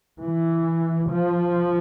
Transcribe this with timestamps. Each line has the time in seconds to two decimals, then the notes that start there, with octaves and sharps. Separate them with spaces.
0.25 E3
1.12 F3